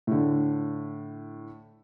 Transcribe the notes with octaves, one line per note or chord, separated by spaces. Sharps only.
A2 D3